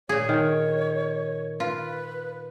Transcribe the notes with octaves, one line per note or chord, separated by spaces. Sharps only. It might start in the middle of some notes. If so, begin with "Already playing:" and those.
A#2 G#4 C#5
D#3
F4 B4